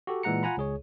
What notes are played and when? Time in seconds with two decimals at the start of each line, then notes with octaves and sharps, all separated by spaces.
0.07 F#4 G4 A4
0.23 A#2 E3 G#3 F#5 A#5 C#7
0.43 F4 F#5 G#5 A#5 B5
0.57 C#2 G#4 C#5